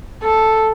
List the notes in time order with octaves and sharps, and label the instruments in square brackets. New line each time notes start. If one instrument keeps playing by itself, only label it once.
[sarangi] A4